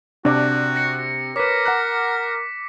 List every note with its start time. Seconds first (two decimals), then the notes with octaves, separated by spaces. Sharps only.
0.25 C3 D4 F#4 D5
0.76 A#6 C#7
1.36 A#4 B4 C#5 D6 B6
1.65 F#5 A#5 F#6